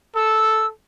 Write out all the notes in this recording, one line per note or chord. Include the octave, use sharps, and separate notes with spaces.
A4 E6